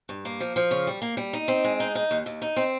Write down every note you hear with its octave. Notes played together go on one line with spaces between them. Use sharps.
G2
A#3
F3
F3
C#3
G3
A#3
G3
D#4
C4
G#3
D#4
D#4
D#2
D#2
D#4
C4